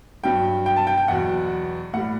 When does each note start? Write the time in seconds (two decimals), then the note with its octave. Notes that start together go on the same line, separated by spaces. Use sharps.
0.24 G2 F#3 G5
0.66 G5
0.76 A5
0.87 G5
0.97 G5
1.08 E2 B2 F#3 F#5
1.93 A2 G3 F#5